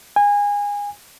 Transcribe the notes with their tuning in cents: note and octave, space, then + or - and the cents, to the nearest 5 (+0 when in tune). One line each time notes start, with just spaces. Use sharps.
G#5 -25